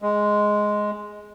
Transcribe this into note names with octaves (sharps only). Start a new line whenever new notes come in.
G#3